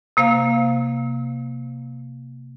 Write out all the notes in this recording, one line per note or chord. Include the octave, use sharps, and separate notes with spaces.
C3 A#3 C5 F5